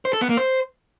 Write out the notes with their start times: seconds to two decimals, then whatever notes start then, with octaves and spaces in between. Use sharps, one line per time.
0.05 C5
0.13 A4
0.21 B3
0.29 A#3
0.37 C5